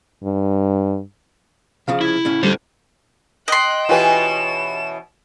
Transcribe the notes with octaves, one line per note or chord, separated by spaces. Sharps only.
G2
C2 C#3 F3 F5
E4 G#6
A2 C#3 C#4
D3 G3 A3 A4 C5
D#5 G5 C6 F#6
B2 E3 C#4 F4 G4 B4 E7